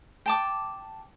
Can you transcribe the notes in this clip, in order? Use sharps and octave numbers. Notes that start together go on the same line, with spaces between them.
G5 A5 D6